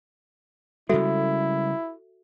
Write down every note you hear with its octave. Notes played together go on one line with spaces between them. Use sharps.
C#3 G3 G#3 E4 F#4 A4 E5